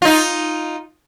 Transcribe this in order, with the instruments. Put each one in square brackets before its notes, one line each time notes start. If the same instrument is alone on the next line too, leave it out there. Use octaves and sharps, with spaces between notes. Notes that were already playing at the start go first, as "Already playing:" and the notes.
[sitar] D#4 F4